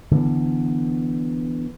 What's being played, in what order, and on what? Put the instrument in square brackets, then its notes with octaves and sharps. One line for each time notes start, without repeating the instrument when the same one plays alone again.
[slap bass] D3 E3 G#3 B3